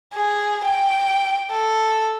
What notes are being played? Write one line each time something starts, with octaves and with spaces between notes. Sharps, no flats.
G#4
G5
A4